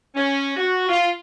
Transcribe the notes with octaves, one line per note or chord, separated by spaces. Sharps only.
C#4
F#4
F4